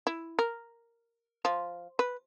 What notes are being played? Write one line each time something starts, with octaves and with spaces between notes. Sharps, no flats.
E4
A#4
F3
B4